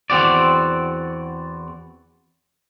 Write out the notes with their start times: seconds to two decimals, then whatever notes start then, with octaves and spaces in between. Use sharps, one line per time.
0.10 E2 C4 F#4 D5